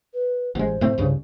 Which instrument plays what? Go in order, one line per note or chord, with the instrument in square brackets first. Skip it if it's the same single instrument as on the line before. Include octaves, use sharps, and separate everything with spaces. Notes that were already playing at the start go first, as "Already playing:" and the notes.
[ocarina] B4
[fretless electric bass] A1 G#3 [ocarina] C5
[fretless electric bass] A2 A3 C4
C2 G2 C#3